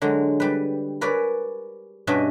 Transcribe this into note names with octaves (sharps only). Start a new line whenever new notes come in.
D3 F#3 G#3
G3 B4
A#4 B4 C#5 D5 G#5
G2 B2 C#4 D4 D#5 E5